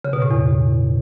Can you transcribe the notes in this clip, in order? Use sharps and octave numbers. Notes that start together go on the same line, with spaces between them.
C#3
B2
A2
E2